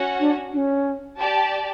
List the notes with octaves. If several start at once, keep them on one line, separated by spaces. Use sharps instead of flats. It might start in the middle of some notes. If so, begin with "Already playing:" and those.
Already playing: C#4 F#4 C#5 F#5
D4
D4
C#4
G4 D5 A5